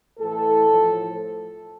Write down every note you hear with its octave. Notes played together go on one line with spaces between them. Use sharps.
A2 E3 A4
A2 F3